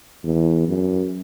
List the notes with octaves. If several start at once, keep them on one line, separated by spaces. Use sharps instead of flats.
E2
F#2